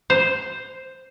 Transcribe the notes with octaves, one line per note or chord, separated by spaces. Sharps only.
C5